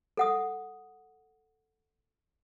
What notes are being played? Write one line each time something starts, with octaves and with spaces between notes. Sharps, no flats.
A4 F#5 D#6